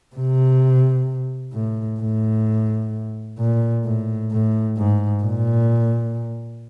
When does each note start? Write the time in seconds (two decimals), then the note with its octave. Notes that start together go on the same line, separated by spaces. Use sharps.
0.16 C3
1.54 A2
2.00 A2
3.39 A#2
3.84 A2
4.31 A2
4.78 G#2
5.23 A#2